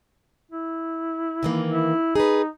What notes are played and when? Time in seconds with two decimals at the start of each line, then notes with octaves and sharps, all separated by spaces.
0.52 E4
1.43 D#3 E3 A#3
1.70 E4
2.15 D#4 G#4 B4